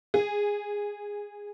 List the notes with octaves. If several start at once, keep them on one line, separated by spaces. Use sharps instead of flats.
G#4